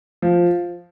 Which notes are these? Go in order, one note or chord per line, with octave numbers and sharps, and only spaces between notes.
F3